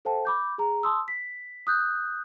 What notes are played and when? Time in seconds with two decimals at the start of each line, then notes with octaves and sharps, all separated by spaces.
0.05 A4 C5 F5 G5 A5
0.25 B5 D6 G6
0.58 G#4 A#5
0.83 A5 C6 D#6 E6
1.08 B6
1.67 D#6 F#6 G6